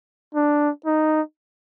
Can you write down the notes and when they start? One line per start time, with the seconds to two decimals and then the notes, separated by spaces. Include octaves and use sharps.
0.34 D4
0.86 D#4